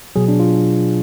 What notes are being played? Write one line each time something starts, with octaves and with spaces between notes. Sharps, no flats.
B2 F#3 G#4
D4
F4